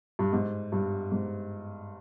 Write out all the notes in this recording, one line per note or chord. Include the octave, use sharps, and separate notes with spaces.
G2
G#2
G2
G#2